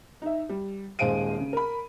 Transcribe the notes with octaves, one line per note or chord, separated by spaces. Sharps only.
D#4 E5
G3
D#1 G#3 C5 F5 D7 D#7
C#3
A#4 B5